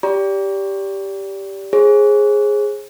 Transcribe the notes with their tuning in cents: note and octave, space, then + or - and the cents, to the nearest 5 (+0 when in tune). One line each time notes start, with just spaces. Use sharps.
G4 +0 D5 -30 A#5 +30
G#4 +0 C5 +40